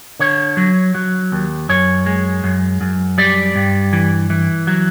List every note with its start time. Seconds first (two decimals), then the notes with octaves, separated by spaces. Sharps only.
0.20 D3 C#5
0.57 F#3
0.95 F#3
1.32 D#2
1.69 F#2 C#5
2.06 G#3
2.44 F#2
2.81 F#2
3.18 G3 D5
3.56 G2
3.93 E3
4.30 E3
4.67 F#3